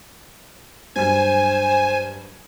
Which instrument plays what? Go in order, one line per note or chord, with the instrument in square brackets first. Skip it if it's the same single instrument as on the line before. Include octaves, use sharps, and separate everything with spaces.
[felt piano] G2 F#3 G#6 [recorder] C5 [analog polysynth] G#5